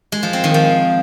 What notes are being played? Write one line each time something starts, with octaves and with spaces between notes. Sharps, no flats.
G#3
F3
C4
D#3
F3